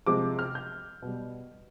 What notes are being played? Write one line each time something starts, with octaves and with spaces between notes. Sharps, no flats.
C3 F3 G#3 D6
F6
G6
B2 G3